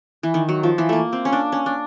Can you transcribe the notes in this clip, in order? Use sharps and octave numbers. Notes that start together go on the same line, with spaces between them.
E3
D#3
F#3
F3
E3
A3 A#3
C4
C#4
D4
C#4
D4